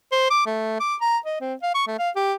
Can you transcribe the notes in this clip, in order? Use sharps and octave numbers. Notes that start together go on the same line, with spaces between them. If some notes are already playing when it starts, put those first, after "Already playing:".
C5
D6
A3
D6
A#5
D#5
C4
F5
C#6
A3
F5
G4